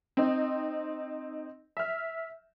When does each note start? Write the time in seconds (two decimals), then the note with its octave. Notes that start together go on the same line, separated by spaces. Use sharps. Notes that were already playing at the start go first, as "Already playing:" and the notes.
0.17 C4 D#4
1.77 E5 F6